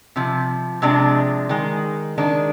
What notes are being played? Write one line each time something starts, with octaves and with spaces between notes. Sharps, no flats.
C3 F3
C3 F3 G#3 D4
D#3 G#3
D#3 G#3 D4